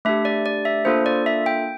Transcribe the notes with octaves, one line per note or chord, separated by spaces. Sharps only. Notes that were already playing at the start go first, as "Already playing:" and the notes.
A3 D4 G4 E5
D5
D5
E5
A#3 D4 F4 A4 C5
D5
E5
G5